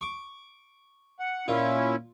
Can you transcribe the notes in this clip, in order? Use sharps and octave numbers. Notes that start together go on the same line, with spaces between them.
C#6 D6
F#5
A#2 C#4 E4 F4